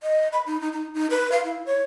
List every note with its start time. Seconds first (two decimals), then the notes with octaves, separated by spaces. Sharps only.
0.03 D#5
0.33 B5
0.46 D#4
0.61 D#4
0.73 D#4
0.94 D#4
1.10 B4
1.32 F5
1.44 E4
1.66 C#5